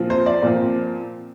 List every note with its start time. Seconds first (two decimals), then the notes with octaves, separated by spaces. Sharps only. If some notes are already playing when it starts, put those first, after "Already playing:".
Already playing: A#2 F3 C4
0.10 C5
0.26 D5
0.42 A#2 F3 C4